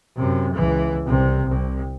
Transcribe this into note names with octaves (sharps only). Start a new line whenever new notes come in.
F#2 C3
C#2 E3
C2 C3
C2